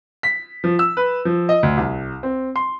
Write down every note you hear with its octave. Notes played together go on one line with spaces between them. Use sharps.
B6
F3
E6
B4
F3
D#5
D2
C2
C4
C6